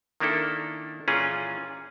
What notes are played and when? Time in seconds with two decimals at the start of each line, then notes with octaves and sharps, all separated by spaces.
0.20 D#3 A#3 D4 E4 A4
1.08 A#2 E3 C#4 F4 G#4